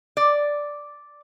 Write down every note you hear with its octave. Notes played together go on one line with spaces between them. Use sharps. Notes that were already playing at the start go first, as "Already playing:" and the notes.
D5